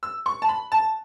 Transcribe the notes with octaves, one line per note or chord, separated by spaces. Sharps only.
E6
C#6
A5
B5
A5